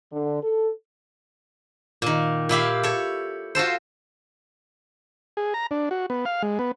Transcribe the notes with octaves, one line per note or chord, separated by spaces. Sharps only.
D3
A4
A#2 D#3
A#2 E4 G4 F5
A4 C#5
F4 F#4 A4 C5
G#4
A#5
D4
F#4
B3
F5
G#3
B3